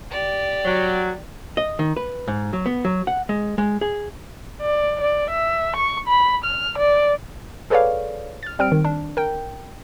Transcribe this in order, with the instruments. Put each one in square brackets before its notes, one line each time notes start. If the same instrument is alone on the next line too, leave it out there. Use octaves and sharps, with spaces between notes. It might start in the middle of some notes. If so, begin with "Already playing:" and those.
[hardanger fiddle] G4 D5
[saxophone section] F#3
[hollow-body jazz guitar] D#5
D#3
B4
G#2
F#3
B3
F#3
F#5
G#3
G#3
G#4
[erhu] D5
D5
E5
C#6
B5
F6
D5
[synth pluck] G#4 A4 B4 C#5 D5 F5
F6 A6
G3 C4 F6 D7
D#3
D4
A#4 G5